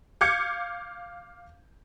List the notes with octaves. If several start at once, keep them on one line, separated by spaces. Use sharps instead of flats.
F5 D6 G6 G#6 C#7